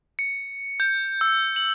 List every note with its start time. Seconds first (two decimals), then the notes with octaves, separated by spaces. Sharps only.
0.19 C#7
0.80 G6
1.21 E6
1.56 F#7